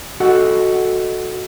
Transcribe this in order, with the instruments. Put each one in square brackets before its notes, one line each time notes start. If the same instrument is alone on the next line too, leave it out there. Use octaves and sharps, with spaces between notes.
[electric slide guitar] F#4 A4 D#5 F#5